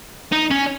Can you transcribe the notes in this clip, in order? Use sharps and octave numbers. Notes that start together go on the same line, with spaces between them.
D#4
C#4